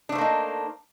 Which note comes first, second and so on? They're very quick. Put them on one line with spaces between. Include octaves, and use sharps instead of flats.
D4 A3 C5 A#3 D#4